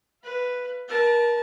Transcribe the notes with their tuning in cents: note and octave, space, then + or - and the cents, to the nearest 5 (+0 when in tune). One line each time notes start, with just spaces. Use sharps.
B4 +0 F5 -30
A#4 +30 A5 -15